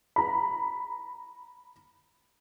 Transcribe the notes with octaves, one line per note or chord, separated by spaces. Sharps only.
A#5 B5